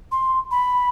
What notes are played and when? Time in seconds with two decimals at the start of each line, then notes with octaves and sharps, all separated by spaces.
0.12 C6
0.51 B5